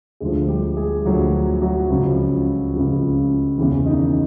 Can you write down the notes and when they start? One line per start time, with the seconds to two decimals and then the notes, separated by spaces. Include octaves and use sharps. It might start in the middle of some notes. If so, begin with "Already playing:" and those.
0.20 D2 D3 F3 G#3 G#4
0.48 G3 G4
0.77 G#3 G#4
1.05 D2 D3 F3 F#3 F#4
1.61 F#3 F#4
1.90 C#2 C#3 F3
2.73 C#2 C#3 F3
3.58 E2 C#3 E3 E4
3.86 D#3 D#4